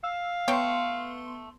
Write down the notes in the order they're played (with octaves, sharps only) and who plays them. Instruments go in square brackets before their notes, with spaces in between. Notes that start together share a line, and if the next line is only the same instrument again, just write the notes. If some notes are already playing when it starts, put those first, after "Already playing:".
[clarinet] F5 [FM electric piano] E6
[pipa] A3 C#5 G5 [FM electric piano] B3 C6